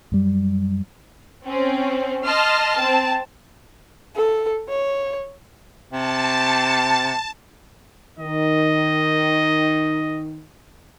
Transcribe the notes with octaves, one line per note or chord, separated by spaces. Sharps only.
F#2 G3
C4 C#4
D#5 A5 C6 F6
C4 A5
A4
C#5
C3 A5
D#3 D#5